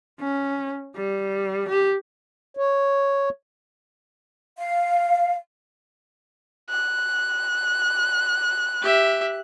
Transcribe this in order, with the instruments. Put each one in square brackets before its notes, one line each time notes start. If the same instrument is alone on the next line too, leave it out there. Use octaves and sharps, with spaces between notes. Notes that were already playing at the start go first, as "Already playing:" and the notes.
[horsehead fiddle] C#4
G3
G4
[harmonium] C#5
[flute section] F5
[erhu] F#6
[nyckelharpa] G4 E5